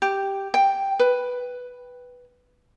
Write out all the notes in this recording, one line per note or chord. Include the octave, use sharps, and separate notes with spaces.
G4
G5
B4